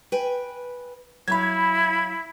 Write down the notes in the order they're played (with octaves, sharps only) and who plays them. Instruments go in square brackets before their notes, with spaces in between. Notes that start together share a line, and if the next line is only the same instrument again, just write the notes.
[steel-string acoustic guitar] B4 G5 G#5
[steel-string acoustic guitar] F#3 E5 F5 [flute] E4 [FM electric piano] B5 G#6